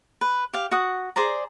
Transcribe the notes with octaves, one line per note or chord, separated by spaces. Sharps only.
B4
G4 F5
F#4 F#5 D#6
G#4 C5 D5 A#5